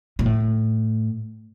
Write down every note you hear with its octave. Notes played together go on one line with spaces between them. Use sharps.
A#2
A2